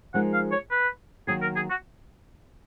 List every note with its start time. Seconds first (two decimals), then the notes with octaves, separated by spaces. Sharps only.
0.14 F3 G#3 D#4 A#4 F#5
0.33 F5
0.52 C#5
0.71 B4
1.27 D#3 F#3 A#3 G#4
1.42 A#4
1.56 G#4
1.70 F#4